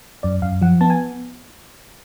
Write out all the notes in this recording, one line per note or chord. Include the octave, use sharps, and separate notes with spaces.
F#2 D5
F#2 F5
F3 F#5
B3 A5
G#5